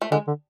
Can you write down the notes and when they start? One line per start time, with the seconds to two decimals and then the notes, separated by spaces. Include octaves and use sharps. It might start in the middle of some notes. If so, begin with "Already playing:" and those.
0.02 A3
0.11 D3 G#3
0.28 D3